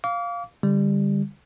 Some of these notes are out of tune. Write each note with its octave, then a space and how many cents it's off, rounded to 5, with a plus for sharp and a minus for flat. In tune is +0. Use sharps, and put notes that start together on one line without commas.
F5 +0 D6 -40
D3 +0 G3 +20